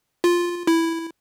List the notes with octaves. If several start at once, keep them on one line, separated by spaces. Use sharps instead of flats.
F4
E4